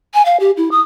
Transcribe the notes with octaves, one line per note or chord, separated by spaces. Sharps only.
G#5
F5
G4
E4
D#6